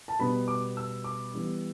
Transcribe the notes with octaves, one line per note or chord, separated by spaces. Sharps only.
A5
B2 G3 B3 B5
D6
E6
D6
E3 G3 B3